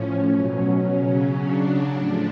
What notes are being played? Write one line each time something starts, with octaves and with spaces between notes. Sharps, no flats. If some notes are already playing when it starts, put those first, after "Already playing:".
Already playing: A2 F3 C#4
B2 F#3
C#3 F#3
C#3 F#3 D4
A2 F3 D4